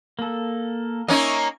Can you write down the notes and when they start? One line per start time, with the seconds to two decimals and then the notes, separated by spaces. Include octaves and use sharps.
0.19 A#3 A4
1.08 A#3 C#4 D#4 D#5 E5 C#6